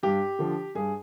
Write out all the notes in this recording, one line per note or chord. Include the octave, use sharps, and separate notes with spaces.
G2 G4
D3 F3
G2 G#4